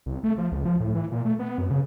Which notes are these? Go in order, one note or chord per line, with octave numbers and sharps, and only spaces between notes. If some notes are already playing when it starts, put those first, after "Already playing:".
C2
A3
F3
C#2
F3
A2
E3
A#2
A3
B3
F#2
C#3